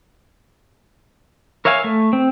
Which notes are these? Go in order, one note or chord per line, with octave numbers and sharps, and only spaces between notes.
A#4 C#5 E5 F5 G#5
A3
C4